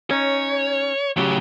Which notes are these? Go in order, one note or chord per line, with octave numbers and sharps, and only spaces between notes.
C#4 D#4 C#5
A2 C#3 F#3 G4